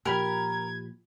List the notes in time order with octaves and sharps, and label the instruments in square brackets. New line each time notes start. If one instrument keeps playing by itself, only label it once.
[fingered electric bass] A#2 F3 [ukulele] G4 B5 [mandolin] A#4 [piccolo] G#6